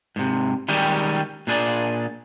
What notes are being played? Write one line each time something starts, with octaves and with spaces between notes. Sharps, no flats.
G#2 C3
D#3 G3 G#3 C#4 G4
A#2 D4 G#4 C5 D5